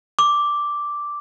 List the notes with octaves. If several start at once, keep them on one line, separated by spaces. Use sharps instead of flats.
D6